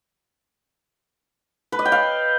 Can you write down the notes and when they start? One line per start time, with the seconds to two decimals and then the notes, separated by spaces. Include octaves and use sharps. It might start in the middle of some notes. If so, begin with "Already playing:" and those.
1.72 B4
1.79 D#5
1.85 G5
1.92 F5